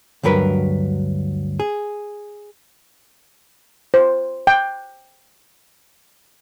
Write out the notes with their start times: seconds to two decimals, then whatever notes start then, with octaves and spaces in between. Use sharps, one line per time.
0.23 D2 G2 F#3 A#4 B4
1.60 G#4
3.94 C5
4.47 G5